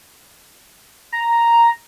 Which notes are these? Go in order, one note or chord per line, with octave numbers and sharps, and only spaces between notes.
A#5